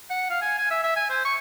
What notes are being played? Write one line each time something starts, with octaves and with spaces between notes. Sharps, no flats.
F#5
F5
G#5
G#5
E5
E5
G#5
C5
C#6